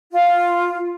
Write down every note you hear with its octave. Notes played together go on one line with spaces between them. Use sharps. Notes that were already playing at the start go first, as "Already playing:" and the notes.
F4